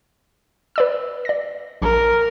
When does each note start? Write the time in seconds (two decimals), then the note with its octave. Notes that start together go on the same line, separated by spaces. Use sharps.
0.76 B4 D5 E6
1.25 D5 A#6
1.82 A#1 A#4